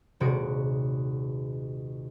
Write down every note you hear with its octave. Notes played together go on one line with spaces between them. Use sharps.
D#1 C3 G#3 F#4 D#6 D7